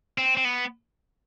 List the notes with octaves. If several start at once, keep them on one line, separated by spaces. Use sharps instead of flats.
C4
C4
B3